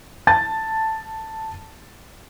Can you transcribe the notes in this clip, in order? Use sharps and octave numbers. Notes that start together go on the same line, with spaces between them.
A5 A6